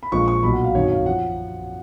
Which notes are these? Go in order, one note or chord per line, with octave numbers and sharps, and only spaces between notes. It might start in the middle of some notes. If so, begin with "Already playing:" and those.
B5
A#1 A#2 F3 G#3 C#6
C#6
B1 A#2 F#3 B5
F#5
F5
G#1 F#2 D#3 F#3 C#5
F5
F3 F#5